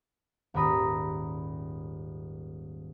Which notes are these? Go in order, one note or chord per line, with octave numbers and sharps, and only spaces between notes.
D#1 G#2 A#4 B5 D#6 A#6